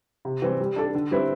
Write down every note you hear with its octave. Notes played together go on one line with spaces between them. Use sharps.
C3
E3 G3 C4
G3
D4 A4 D5
D3
G3 C4 E4 B4